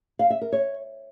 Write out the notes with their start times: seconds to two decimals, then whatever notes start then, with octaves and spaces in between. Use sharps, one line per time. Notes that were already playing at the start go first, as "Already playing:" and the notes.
0.19 F5
0.30 E5
0.41 A#4
0.52 C#5